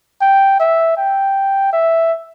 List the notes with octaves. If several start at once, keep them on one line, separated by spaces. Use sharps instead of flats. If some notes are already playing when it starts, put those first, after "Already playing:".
G5
E5
G5
E5